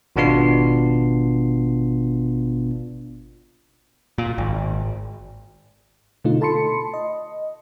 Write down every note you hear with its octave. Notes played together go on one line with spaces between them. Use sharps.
G#1 B2 B3 D4 F4 C7
A#2
G#1
B2 D3 A3 D#4 F4
A4 A5 B5 C6 C#7
D#5